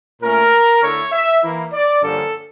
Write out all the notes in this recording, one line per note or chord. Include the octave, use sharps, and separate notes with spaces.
A#2 A3 C#4 A#4
D3 A3 E4 C#5
E5
E3 A#3 E4
D5
G2 D3 F3 A#3 C#4 A4